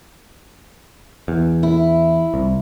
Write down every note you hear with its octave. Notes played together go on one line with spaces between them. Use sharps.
E2
E4
C2